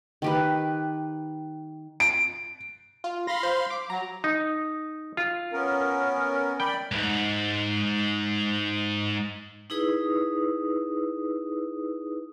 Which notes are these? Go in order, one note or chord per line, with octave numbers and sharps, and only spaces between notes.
D#3 G4 B4
D7
F4
F5 B5 C6 A#6
C5
D6
F#3 A#5
D#4
F4
B3 C#4 A#4
D5 G5 B5
C#2 G#2
D#4 E4 G#4 B4 D#6 E6